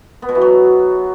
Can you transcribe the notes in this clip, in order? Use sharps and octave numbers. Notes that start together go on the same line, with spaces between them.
B3
B2
E3
F#3